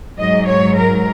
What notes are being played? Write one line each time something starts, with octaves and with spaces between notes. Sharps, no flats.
G#2 F#3 D#5
C#5
A#4